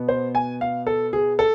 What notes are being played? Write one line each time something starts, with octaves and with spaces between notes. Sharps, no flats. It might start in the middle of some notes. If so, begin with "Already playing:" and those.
Already playing: B2 B3
C5
G#5
F5
A4
G#4
A4